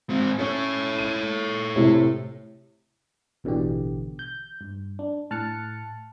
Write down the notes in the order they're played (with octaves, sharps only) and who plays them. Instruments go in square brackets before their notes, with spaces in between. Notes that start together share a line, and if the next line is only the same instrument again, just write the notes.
[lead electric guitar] G#2 C4
[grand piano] C#4 [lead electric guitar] A4 C#5
[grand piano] D#7
A2 C3
[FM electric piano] A1 B2 D3 E3 G4
G6
G2
D4
A2 A5 F6 F#6 A6 C#7